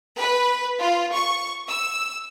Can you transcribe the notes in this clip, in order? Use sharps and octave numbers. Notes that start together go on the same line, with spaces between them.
B4
F4
C#6
E6